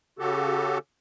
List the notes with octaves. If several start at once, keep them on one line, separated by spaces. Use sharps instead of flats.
C#3 F#4 G4 A4